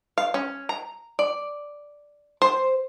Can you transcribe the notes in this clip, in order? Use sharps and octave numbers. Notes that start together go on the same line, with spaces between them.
F5
C#4
A#5
D5
C5